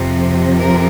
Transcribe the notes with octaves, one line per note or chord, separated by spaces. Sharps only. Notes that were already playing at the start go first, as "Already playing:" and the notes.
Already playing: F2 C3 F3
A#4